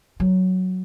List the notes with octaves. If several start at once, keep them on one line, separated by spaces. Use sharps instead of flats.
F#3